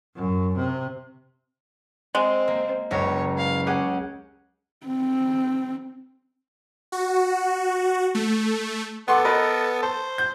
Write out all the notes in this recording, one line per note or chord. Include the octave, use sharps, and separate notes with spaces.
F#2
C3
G#3 C4
A#3
F#1 C#2 A#4 C#5
F5
C#4 G4 G#4 F#5
C4
F#4
A3
B3 A4 F#5 C6 D6
A#4 B4 D#5
C5 A5
G6